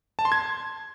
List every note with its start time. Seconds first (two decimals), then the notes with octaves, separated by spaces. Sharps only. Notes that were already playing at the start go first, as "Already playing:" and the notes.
0.19 A5
0.25 C6
0.32 G#6